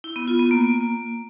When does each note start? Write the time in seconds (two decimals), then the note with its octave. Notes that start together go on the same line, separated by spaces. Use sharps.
0.04 E4
0.16 B3
0.28 F4
0.39 B3
0.51 A#3